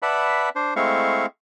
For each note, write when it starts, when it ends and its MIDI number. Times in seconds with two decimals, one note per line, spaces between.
0.02 0.49 71
0.02 0.49 74
0.02 0.49 76
0.02 0.49 78
0.02 0.49 81
0.02 0.49 83
0.55 0.74 62
0.55 0.74 72
0.76 1.26 56
0.76 1.26 57
0.76 1.26 60
0.76 1.26 64
0.76 1.26 77
0.76 1.26 85